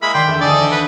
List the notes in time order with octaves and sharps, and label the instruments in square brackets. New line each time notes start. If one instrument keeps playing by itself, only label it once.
[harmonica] G#3 A#3 E4 [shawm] B5
[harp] D#3 F#3 [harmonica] D5 C6 [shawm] G5
[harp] E1 E5 [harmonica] A3
[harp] D2 [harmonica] G#4 A4 D#5 [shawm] D5
[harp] G6 A#6
[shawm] B4